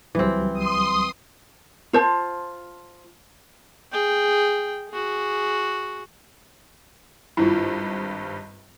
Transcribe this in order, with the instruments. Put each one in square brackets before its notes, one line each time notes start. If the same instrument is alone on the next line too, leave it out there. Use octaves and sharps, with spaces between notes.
[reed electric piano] C#2 F#3 G3 [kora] E3 C4
[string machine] C6 D#6
[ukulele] F4 C5 A5
[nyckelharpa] G#4 G5
F#4 G#4
[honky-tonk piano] G#1 G2 [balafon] E4 F4